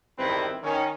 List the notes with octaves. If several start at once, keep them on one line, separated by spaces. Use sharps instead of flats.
E2 G2 D#3 C4 E4 B4
D#3 C#4